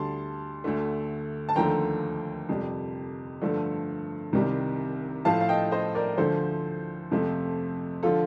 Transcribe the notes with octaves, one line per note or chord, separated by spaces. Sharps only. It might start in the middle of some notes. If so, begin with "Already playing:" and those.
Already playing: D2 D3 G3 A5 C6
D2 D3 A3
A5
D#2 D3 F3 A3 G5 A#5
F2 C3 G3
G2 D3 F3 A3
C2 C3 D#3 G3
A2 F3 A3 F5 A5
F5
D#5 G5
C5 D#5
A#4 D5
D2 D3 F3 A4 C5
F2 C3 F3 A3
D3 F3 F4 A4